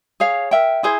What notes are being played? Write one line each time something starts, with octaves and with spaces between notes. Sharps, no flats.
G#4 C#5 F5
A#4 E5 G5
E4 G#4 C5